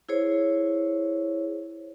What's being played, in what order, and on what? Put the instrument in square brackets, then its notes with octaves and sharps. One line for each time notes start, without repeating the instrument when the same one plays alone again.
[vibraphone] E4 G#4 C5 C#5